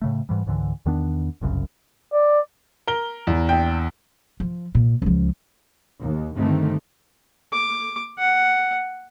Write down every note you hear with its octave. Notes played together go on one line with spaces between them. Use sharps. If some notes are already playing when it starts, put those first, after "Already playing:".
A2 C#3 A3
G#2 E3 G3
C#2 G#2 D3 E3
E2 D#3 B3 D4
G1 C2 F#2 C#3
D5
A#4 G7
E2
A#1 G5
F3
A#2
C#2 F3
D#2
G2 D3 D#3 A3 C4
D6
F#5